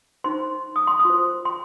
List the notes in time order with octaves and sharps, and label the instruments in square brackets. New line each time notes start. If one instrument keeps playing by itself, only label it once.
[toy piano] D#4 C5 C6
D#6
C6
D#6
F4 C5
C6